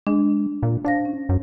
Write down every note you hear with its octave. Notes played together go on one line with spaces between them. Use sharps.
G#3 D4
A#2
D4 C5 F5 A#6
C#4
F#2